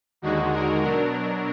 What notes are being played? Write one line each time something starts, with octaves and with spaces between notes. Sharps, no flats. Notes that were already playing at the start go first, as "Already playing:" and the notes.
D#2 D3 G#3 D#4 F#4
A#4
B2 F#3 D4 A#4